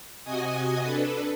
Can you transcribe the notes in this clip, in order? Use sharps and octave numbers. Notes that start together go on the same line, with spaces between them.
C3 F#4 D#5 G#5 D#6
D4 A4 B4